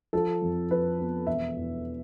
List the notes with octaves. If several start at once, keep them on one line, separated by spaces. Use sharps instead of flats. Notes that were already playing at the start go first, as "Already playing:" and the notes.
F3 A4
F2
F3 B4
B3
E1 E5
E2